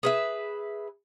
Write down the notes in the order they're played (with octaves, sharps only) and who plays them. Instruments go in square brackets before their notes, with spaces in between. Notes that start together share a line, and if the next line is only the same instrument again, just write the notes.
[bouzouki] G#4 B4 E5